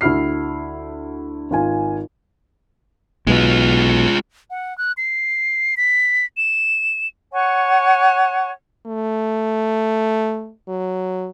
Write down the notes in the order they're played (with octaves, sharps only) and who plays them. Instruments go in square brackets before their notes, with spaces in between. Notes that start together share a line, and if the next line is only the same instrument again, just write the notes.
[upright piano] D2 E4 F#4 F6 C7
G#1 F4 G#5
[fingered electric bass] B1 B2 [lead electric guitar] G#3 F4
[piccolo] F#5
F#6
C7
B6
E7
[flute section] C#5 F#5 G#5 C#6
[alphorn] A3
F#3